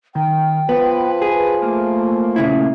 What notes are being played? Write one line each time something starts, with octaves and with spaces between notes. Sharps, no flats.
D#3 G5
F3 B3 B4
G#4
A3 A#3
A#2 C#3 E4